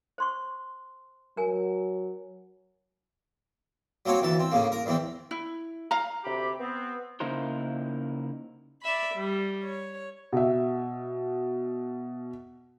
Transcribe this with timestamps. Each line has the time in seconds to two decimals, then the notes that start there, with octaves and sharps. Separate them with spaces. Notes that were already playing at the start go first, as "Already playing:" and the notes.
0.18 C5 C6 C#6
1.37 F#3 A#4 G#5
4.06 F#3 A#3 C4 C#5
4.22 D2 E3 A5
4.39 C4
4.52 A2 C#3 A#3
4.72 A#4
4.86 E2 E3 C4
5.31 E4
5.91 F5 A#5
6.25 D2 C3 G4 B5 D6
6.60 B3 C4
7.20 C#3 A#3 D#4 E4 A#4 C5
8.83 D5 E5 B5
9.15 G3
9.63 C#5
10.33 B2 E5